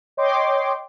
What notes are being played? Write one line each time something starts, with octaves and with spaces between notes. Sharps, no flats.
C#5 D#5 G5 C6 D6